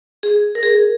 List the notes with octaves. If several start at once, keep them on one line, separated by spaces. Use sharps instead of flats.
G#4
A#4
G#4